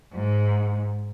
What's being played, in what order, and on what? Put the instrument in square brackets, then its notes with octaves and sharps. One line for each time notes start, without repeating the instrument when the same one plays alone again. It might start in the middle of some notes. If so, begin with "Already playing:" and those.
[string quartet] G#2